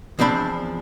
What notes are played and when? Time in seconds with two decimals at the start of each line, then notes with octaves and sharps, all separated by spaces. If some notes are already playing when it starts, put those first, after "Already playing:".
0.19 E2 F3 C4 D4 B5